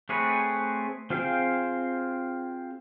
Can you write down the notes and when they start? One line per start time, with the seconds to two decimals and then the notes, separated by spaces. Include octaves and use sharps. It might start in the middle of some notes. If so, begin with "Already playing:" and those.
0.09 A3 C4 G#4 B4 C#5
1.10 C4 F4 G#4 F5 G5